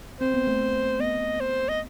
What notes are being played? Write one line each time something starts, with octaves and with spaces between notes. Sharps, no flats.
C4 C5
B3
A3
B3 D#5
C5
D#5